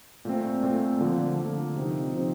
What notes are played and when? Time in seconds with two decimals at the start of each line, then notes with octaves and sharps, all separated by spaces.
0.25 A#2 A3 C4
0.63 A#2 A3 C4
1.01 D3 F3 A#3
1.38 D3 F3 A#3
1.76 C3 F3 C4 D#4
2.14 C3 F3 C4 D#4